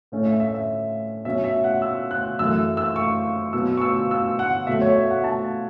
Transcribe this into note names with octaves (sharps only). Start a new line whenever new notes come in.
A2 A3 C#4
E5
E5
E5
B2 F#3 C#4 E5
E5
F#5
E6
F#6
F#2 E3 A3 E6
E6
C#6
B2 F#3 B3 E6
C#6
E6
E6
F#5
B2 F#3 A3 E5
C#5
E5
F#5
A5